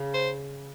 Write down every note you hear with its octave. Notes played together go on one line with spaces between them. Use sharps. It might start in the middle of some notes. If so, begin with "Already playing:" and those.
Already playing: C#3
C5